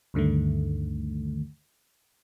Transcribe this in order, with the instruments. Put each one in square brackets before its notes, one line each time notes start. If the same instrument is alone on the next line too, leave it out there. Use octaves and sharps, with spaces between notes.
[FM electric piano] D2 G2 D3 D#3 A3